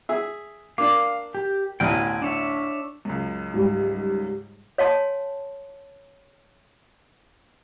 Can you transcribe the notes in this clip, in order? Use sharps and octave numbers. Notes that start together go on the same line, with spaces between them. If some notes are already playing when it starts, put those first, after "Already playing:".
G#4 E5
A#3 D4 F5 D6
G4
A1 D2 B2 G5 G#5
D4 C#5 E5
C#2 F#2
G#2 G3
C#5 F5 G#5 A5 C6